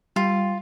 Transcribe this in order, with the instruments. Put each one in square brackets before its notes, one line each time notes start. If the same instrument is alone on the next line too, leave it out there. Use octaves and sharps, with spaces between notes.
[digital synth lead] G3 [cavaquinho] F4